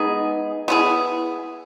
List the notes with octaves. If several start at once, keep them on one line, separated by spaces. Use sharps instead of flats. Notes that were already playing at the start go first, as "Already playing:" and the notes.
Already playing: G#3 B3 D#4 G#4
B3 E4 G#4